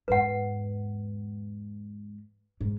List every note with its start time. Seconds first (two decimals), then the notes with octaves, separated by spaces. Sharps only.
0.08 E2 G#2 B4 F#5
2.61 G#2 D3